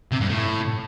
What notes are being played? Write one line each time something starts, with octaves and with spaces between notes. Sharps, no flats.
C3
G2
A2